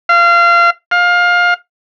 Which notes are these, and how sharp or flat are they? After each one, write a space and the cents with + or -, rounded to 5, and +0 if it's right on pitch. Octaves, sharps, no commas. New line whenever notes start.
F5 -25
F5 +20